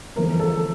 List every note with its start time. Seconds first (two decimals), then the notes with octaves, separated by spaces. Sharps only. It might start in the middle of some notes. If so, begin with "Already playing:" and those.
0.16 G1 F2 E3 A3 A#4
0.40 A4